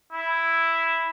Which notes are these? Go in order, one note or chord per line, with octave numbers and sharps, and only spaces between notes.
E4